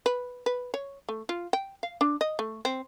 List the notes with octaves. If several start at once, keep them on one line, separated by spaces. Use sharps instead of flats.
B4
B4
C#5
A3
F4
G5
F5
D4
D#5
A3
C4